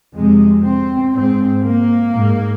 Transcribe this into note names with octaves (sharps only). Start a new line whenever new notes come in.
F2 C3 G#3
C4
G#2 C4
A#3
G#2